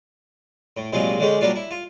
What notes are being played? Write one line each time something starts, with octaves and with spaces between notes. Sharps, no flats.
A2
C2 A#2 F#3 G#3 F4
D3 G#3 C#4 G4
F#3 G3 A#3 D4 F4
E4
F4